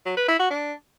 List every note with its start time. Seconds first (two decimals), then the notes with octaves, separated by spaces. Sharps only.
0.06 F#3
0.17 B4
0.28 E4
0.39 F#4
0.50 D4